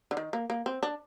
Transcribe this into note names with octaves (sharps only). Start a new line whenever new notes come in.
D3
D#3
A#3
A#3
C4
D4